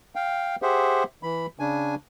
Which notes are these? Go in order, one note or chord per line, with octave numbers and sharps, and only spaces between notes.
F5 G5
G4 G#4 C5 E5 F#5
E3 B5
C#3 D4 G#5